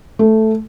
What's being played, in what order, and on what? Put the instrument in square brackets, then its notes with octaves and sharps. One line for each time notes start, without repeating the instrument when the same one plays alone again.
[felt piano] A3